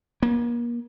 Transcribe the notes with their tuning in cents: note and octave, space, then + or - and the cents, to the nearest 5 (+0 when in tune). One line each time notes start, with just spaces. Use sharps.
A#3 +35